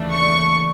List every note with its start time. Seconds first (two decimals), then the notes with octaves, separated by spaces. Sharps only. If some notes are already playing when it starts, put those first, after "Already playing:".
Already playing: D#2 C#3 E3 A3 D4
0.13 C#6